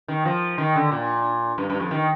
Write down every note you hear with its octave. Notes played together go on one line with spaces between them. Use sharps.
D#3
F3
D#3
D3
A#2
G2
G2
F2
D#3